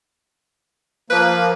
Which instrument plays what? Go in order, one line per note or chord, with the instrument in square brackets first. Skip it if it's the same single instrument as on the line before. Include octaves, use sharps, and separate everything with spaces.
[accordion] F3 A#3 [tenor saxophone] B4